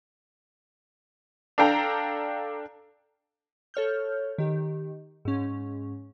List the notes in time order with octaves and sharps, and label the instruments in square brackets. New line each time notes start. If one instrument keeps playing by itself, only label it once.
[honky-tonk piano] D4 A4 F5 G5 A#5
[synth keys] A4 C#5 F6 G6
D#3 G4
G#2 C#4